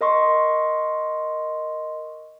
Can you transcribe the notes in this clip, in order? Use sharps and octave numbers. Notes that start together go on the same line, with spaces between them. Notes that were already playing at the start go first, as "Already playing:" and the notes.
A#4 D#5 C6 C#6